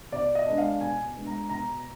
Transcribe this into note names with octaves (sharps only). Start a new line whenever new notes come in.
B2 D5
D#5
G#3 B3 D4
F5
B2 G#5
G#3 B3 D4
A#5
B2 A#5